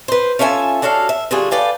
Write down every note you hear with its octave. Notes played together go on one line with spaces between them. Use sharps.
B4 C5
C#4 F4 A4 E5 G#5
D4 F#4 A4 C#5 F5
E5
D3 G3 F4 F#4 G#4
A4 B4 D5 F5 G5